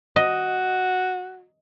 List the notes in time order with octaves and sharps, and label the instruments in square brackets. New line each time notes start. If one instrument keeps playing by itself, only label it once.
[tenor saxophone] F#4 [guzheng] D#5